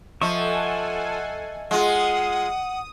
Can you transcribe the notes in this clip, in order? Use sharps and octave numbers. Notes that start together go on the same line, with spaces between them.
F3 A4 D#5 E5 F#5 G#5 C#6
G#3 F4 F#5 D#6